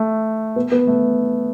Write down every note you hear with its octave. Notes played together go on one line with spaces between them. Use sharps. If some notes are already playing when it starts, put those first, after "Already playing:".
Already playing: A3
B3
B3
A3